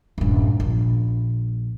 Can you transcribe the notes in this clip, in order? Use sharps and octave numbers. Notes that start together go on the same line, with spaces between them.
D#1 G2
A#1